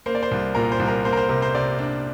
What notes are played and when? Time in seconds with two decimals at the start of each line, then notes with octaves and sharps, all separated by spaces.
0.06 A#3 C5
0.15 D5
0.23 C5
0.31 C2
0.55 A#2 A#4
0.72 C5
0.79 C2
0.88 A#4
1.04 A#3 C5
1.13 A#4
1.17 C5
1.29 C3 A#4
1.42 C5
1.55 C3 D5
1.79 D4